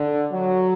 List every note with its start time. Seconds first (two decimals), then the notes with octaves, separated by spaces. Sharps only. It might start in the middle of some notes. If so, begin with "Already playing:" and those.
Already playing: D3
0.33 F#3